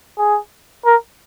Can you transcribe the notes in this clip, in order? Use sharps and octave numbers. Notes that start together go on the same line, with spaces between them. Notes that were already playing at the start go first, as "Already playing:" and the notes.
G#4
A#4